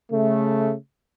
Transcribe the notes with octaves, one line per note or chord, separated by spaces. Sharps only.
C#3 A3